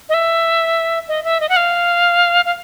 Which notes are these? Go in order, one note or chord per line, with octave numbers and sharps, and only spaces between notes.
D#5
E5
D#5
E5
D#5
F#5
F5
F5